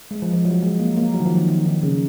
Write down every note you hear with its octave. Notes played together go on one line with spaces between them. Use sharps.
G#3
F3
F3
F#3
G#3
A#3
A#3
F#3
D#3
F3
D#3
D#3
D#3
C#3